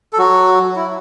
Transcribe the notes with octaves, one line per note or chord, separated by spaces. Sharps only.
A4
F#3 F#4
E4